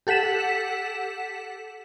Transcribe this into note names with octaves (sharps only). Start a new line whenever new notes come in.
G4 A4 F#5 B6 E7